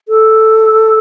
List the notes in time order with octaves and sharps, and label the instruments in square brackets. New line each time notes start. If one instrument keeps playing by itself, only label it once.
[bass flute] A4